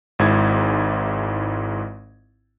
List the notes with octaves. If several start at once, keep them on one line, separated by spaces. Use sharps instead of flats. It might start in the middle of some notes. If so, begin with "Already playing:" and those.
G#1 G#2 E4 G#6